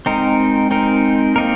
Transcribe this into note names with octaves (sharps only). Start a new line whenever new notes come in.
G#3 C4 D#4 A#4
C4 D#4 A#4
A#3 C4 D#4 A#4